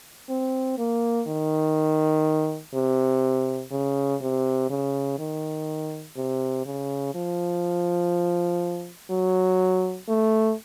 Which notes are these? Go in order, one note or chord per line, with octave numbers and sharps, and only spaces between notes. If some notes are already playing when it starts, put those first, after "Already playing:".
C4
A#3
D#3
C3
C#3
C3
C#3
D#3
C3
C#3
F3
F#3
A3